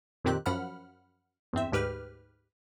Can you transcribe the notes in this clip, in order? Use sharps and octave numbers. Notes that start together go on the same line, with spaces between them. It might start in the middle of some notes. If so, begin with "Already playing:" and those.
F2 A#2 D#3 C4 G4 F#6
F#2 F3 F#5 B5 F6
E2 G2 C4 E5
D2 G#2 G4 B4 F6